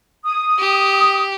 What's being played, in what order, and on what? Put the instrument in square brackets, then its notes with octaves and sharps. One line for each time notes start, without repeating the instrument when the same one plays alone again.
[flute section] D#6
[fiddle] G4